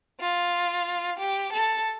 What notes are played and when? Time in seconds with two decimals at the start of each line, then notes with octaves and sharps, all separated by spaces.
0.20 F4
1.19 G4
1.53 A4